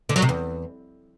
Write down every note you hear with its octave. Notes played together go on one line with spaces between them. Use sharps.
D3
F#3
C3
E2